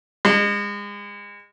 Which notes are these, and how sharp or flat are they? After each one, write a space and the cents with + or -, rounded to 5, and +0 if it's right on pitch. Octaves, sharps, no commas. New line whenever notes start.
G#3 -30